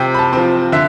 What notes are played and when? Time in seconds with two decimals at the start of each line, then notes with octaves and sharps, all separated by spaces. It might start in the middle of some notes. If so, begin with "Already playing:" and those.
Already playing: C3 F3 G5
0.14 B5
0.19 A5
0.33 F3 C4
0.72 D3 E5